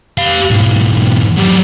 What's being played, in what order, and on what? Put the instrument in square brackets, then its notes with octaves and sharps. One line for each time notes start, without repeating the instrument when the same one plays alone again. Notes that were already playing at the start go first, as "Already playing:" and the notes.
[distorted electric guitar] G4 F5
B1 G#2
F#3 G4